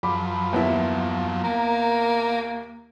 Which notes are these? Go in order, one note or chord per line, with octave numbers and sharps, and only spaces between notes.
F#2 F3 B5 D6
D#2 B3 E4
A#3 A#4